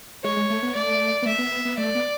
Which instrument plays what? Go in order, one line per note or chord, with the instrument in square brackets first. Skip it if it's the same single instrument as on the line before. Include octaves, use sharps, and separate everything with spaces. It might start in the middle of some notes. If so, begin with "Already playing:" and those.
[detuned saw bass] G#3 [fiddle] C#5
[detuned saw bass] G#3
A3
B3
[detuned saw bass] A3 [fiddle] D5
[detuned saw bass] B3
[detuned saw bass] A3 [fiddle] E5
[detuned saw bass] B3
B3
B3
[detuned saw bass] A3 [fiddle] D5
[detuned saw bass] B3